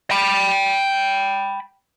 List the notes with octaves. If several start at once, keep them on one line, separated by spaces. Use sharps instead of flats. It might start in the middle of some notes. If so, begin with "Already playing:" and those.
G5 B5